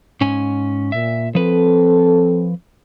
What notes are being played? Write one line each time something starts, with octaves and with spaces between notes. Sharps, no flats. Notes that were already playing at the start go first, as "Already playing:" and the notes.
G#2 C#4 G#5
A#2 E5
F3 C4 A4 B4